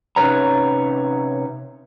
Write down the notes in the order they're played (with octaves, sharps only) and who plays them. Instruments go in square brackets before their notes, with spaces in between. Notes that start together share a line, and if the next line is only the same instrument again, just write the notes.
[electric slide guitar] C3 C#4 D#4 B4 C#5 A#5